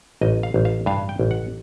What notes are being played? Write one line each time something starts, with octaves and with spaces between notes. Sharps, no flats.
A1 D#5
F5
A1
F5
G2 F5
G5
A1
F#5